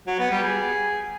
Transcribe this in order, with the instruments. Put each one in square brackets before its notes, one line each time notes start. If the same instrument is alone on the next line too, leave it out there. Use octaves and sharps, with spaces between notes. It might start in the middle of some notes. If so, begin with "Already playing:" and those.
[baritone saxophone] F#3
B3
G3
G#4